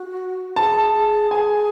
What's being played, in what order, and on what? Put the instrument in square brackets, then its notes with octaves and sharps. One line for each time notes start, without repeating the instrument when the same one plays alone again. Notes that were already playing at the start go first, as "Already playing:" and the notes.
Already playing: [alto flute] F#4
[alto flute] G#4 [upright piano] A5
[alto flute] G#4
[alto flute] G#4 [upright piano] G#5